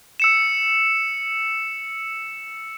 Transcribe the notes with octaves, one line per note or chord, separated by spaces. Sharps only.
E6 C#7 E7